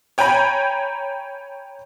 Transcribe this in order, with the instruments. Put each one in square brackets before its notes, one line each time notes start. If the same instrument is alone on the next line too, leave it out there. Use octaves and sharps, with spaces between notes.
[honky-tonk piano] C#5 G5 G#5 A#5 B5